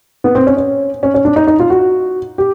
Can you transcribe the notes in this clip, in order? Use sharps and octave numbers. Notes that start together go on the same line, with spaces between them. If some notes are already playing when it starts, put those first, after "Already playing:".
B3
C4
C#4
C#4
C#4
C#4
D4
D#4
D#4
F4
F#4
G4